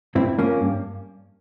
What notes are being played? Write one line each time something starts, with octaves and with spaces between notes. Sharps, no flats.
G2 C4 E4
F3 A#3 C#4
G2